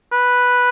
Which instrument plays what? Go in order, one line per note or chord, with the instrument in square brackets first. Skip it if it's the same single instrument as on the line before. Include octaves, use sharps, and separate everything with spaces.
[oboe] B4